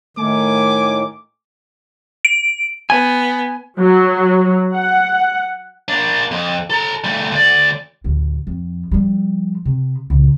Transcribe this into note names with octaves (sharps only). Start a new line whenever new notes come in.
A2 D#3 A3 G#5 D6
D7
B3 G#5
F#3
F#5
A#3 D4
F2
A4 A#5
G3 A3
D2 D5
A1 D2
F2
F3 G3
C3
C#2 A#2